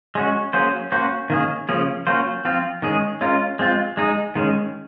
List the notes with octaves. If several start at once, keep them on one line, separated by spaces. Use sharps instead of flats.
G#3 C#4 F#4
F#3 A#3 C#4 G#4 C5
A#3 C#4 F#4 C5
D#3 A#3 C#4 G#4
C#3 F3 A#3 C#4 G#4
F#3 A#3 C#4 F4 C5
F3 C4 F4
D#3 G#3 C#4 G#4
G#3 C#4 F4 A#4
G#3 C4 F4
G#3 D#4 G#4
D#3 G#3 C#4